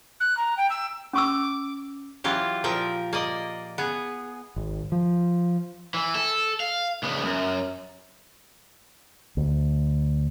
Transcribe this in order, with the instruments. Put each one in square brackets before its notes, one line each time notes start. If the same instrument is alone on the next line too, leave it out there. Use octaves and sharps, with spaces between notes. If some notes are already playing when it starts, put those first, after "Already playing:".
[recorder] F#6
A#5
G5
E6
[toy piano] C#4 C#6 E6 [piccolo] D6
[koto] E3 F#3 F4 G4
A#2 F3 A#4 G5
A#3 D5 D#5
B3 G#4
[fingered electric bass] G#1
F3
[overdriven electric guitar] E3
A4
F5
C#2 B3
F#2
[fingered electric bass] D2